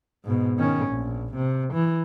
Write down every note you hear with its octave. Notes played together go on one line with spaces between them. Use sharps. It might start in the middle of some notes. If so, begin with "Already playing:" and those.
G#2 B2
D#3 C#4
A#1
C3
E3